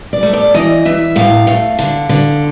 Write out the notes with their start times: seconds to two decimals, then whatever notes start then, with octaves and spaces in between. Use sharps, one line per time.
0.13 D5
0.23 A3
0.33 D5
0.54 E3 D#5
0.85 E3 E5
1.16 A2 F5
1.47 A3
1.79 D3
2.09 D3